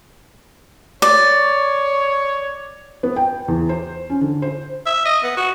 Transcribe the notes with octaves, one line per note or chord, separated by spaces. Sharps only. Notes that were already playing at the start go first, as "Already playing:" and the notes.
C#5 D5
B3
G5
E2
C5
C#4
D3
C5
E5
D#5
B3
F#4